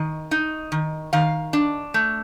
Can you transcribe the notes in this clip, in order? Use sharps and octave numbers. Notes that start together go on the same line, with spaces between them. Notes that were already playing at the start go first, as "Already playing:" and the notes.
Already playing: D#3 D#5
D#4
D#3
D#3 F5
D4
A3